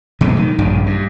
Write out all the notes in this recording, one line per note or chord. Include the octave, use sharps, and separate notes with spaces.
B2 F#3 G#3 A3
D#3
A#1 G2 C#3
G2